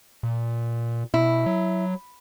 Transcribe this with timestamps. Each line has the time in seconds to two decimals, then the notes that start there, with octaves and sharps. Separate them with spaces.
0.23 A#2
1.14 B2 E4
1.46 F#3